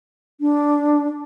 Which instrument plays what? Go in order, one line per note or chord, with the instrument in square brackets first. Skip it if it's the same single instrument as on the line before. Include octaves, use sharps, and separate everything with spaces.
[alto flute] D4